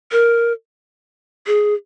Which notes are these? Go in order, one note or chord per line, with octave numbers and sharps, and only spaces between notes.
A#4
G#4